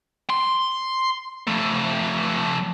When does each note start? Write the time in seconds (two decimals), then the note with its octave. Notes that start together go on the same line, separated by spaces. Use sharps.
0.30 C6
1.48 F3 A3